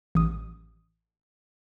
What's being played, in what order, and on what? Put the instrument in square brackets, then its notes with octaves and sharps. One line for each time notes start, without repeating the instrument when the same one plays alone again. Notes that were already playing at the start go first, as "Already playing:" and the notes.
[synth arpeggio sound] A1 D#6